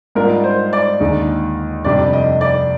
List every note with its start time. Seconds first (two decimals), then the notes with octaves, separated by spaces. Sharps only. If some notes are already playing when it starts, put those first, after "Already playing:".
0.15 G#2 G3 D4 F4 A#4
0.44 C5
0.73 D5
1.00 D#2 D3 G#3 D#4
1.85 F2 C3 G3 D4 G4 D5
2.13 D#5
2.41 D5